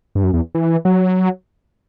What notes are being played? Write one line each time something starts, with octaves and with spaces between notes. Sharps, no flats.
G2
F#2
E2
E3
F#3